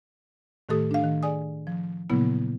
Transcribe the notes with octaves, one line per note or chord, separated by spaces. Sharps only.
A2 D#3 A3 G4 A4 D#6
D4 F5
D#3
G#4 D5 G#5 D#6
F3
A#2 C#3 F#3 A#3 B3 E4